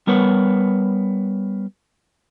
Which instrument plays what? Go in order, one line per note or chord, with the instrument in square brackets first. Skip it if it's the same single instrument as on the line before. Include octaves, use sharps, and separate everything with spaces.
[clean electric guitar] G3 B3 A#4 B4 C#5 F#5